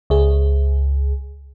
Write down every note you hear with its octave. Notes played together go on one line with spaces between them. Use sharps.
C#2 G#4